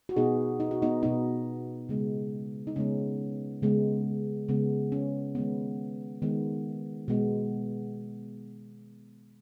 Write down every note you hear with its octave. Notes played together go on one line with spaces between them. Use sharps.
F#4
B2 B3 D#4 G#4
D#4
F#4
B3 D#4
B2 B3 D#4
C#3 G#3 B3
D#4
C#3 G#3 B3 C#4
C#3 G#3 B3
C#3 G#3 B3
C#4
D#3 G#3 B3
D#3 G#3 B3
B2 G#3 B3